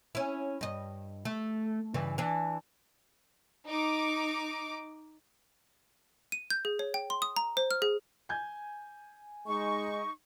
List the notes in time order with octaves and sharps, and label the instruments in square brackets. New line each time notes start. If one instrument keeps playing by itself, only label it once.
[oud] C#4 E4
G2 D#5
A3
G2 C#3 E3
E3 D4
[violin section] D#4 D6
[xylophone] D#7
G6
G#4
C#5
G5
C6
D#6
A#5
C5
F6
G#4
[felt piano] G#5 G6 G#6
[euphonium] G#3 [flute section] D#4 C#6